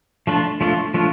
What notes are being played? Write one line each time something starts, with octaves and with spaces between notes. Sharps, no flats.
F3 A3 D4 F4
F3 A3 D4 F4
F3 A3 D4 F4